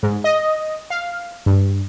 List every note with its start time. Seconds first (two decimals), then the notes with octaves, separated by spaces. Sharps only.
0.03 G#2
0.24 D#5
0.90 F5
1.46 G2